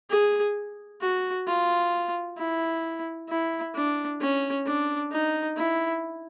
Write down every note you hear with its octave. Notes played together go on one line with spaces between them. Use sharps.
G#4
F#4
F4
E4
E4
D4
C#4
D4
D#4
E4